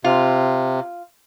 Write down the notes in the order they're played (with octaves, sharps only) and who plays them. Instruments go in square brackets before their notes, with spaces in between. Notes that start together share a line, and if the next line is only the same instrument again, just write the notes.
[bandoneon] C3 [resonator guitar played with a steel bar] F4